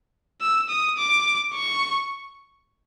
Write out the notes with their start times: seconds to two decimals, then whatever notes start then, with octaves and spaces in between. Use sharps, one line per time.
0.41 E6
0.69 D#6
0.98 D6
1.54 C#6